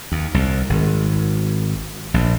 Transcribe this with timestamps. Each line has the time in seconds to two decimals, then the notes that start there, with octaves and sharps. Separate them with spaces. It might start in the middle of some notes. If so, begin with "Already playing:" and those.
0.12 D#2
0.34 C2
0.69 G#1
2.14 A#1